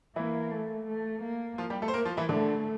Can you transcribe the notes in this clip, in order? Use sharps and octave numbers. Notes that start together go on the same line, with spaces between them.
E3 A#3 E4
A3
A3
A#3
F3 F4
G3 G4
A3 A4
C5
A#3 A#4
F3 F4
E3 E4
D3 A3 D4